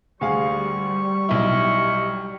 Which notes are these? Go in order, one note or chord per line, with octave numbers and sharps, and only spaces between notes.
D2 G3 G#4 F5 C#6
B1 E4